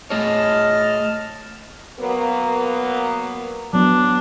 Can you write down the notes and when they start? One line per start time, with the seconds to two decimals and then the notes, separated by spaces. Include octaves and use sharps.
0.10 A3 G#4 C#5 D#5 A5 F6
1.99 F#3 A#3 B3
3.73 F#3 B3 D4